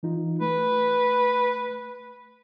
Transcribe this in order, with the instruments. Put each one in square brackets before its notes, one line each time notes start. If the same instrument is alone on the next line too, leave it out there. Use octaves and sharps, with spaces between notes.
[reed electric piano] E3 D#4 F4
[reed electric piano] A3 [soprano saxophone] B4